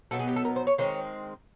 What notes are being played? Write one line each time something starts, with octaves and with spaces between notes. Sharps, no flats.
B2 F#3 B3 D#4 A4
G#4
G4
A4
A#4
C5
C#5
D#3 G#3 C4 C#5